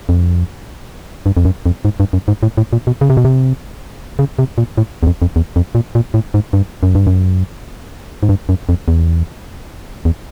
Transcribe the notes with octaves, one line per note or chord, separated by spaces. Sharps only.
F2
G2
F2
F#2
F2
G#2
G2
F#2
G#2
A2
A2
A#2
B2
C#3
C3
B2
C3
C#3
C3
A#2
A2
E2
F2
F2
E2
F2
A#2
A#2
A2
G#2
G2
F#2
G2
F#2
G#2
G2
F#2
F2
E2
E2